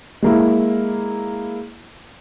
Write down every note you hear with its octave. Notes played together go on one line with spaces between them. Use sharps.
G#3 A#3 E4